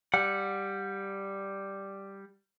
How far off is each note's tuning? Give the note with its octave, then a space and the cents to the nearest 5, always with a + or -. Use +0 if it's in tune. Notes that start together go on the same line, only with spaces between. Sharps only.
G3 +0 F#5 -20